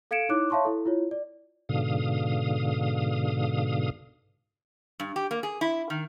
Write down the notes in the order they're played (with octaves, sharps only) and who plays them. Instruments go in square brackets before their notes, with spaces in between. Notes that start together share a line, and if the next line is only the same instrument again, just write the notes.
[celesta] A4 F5 G#6 C#7 D7 E7
D#4 E4 C#5 D6 F#6
C#5 E5 F5 A5 C6 C#6
E4 A4
E4 F4 C#5
D5
[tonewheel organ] G#2 B2 D3 F5 D#6
[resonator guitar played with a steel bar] G2
G4
A#3
G#4
E4
D#3